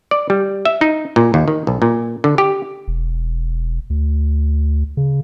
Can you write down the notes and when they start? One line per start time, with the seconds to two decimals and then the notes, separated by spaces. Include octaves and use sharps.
0.11 D5
0.30 G3
0.65 E5
0.81 D#4
1.16 A#2
1.34 D#2
1.48 D#3
1.67 B1
1.82 A#2
2.24 D3
2.38 G4
2.88 E1
3.90 D2
4.97 C#3